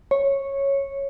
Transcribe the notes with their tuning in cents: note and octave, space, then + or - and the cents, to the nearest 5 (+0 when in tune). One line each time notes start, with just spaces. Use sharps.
C#5 -10